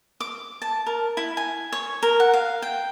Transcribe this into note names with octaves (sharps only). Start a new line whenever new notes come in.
D6
A5
A#4
E4
G#5
C#5
A#4
F#5
F5
G5